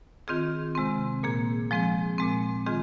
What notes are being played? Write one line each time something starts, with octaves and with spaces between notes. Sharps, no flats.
D#3 C4 F4 G#4
C3 G#3 C4
A#2 A#3 G#4
F3 G#3 C4 G#4
A#2 G#3 C4
D#3 G#3 C4 F4 G#4